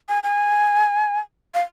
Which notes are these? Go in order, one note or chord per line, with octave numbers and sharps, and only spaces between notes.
G#5
G#5
F5